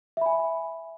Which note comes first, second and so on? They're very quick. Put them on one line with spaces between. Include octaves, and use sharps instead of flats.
E5 B5 G#5